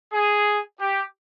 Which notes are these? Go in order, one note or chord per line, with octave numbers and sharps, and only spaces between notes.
G#4
G4